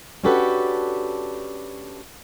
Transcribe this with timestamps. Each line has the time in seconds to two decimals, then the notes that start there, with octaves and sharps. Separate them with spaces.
0.24 C#4 D4 F#4 G4 A4 B4